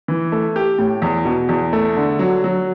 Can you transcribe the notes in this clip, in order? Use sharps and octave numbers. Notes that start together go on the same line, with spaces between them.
E3
A3
G4
A2
E2
B2
E2
A3
D3
F#3
F#3